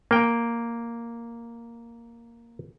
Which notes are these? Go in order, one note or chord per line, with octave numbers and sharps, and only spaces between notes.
A#3 G5